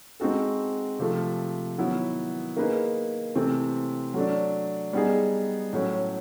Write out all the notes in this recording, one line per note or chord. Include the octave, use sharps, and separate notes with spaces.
G#3 C4 D#4 F#4 A4
C3 F3 A3
D#3 F#3 B3 E4
A#3 D#4 G#4 B4
C3 E3 A3 C4
F#3 A3 D4
G3 B3 D#4 G#4
A2 F#3 A3 C#4